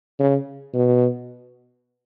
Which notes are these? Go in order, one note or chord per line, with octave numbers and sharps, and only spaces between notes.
C#3
B2